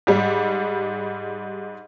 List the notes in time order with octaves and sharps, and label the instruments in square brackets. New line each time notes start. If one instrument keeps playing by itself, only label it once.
[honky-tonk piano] G#2 G3